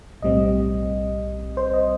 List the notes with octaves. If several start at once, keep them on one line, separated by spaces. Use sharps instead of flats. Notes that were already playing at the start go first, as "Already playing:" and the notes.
B1 A2 G3 C4 D#5
C5
D#5